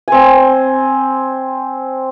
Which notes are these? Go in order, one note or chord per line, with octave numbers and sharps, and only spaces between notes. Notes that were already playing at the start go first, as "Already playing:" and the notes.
C4 G#5